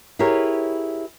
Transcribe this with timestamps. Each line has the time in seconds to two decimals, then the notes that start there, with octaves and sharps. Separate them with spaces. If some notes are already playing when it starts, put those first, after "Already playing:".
0.19 E4 G4 G#4 A#4 B4 C#5